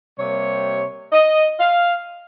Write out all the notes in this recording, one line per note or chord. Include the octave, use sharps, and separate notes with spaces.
C3 G3 A#3 C#5
D#5
F5